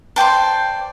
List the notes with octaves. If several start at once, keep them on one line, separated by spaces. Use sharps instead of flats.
C5 D5 G5 A5